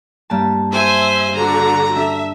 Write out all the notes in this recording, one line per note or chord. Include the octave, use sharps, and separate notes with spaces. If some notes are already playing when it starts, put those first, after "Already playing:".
G2 A#3 A5
C5 E5 G#5
D3 F#4 A#5
D4 E5